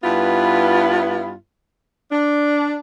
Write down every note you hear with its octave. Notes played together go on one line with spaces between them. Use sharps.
G2 B3 E4 F4
D4